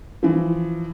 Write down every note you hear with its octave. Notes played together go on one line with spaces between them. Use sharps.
E3 F3